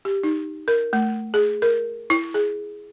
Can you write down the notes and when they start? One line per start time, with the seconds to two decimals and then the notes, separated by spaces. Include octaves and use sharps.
0.05 G4
0.24 D#4
0.68 A#4
0.93 A3
1.34 G#4
1.62 A#4
2.10 E4
2.34 G#4